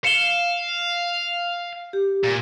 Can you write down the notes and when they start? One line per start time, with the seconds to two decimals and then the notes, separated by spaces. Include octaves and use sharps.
0.05 F5 C#7 E7 G7
1.93 G4
2.24 A#2